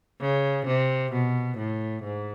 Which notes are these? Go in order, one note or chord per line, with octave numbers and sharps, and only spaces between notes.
C#3
C3
B2
A2
G#2